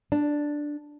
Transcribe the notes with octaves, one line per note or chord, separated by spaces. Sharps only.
D4